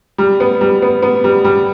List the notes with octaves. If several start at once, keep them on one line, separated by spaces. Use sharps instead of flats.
G3
B3
G3
B3
B3
G3
G3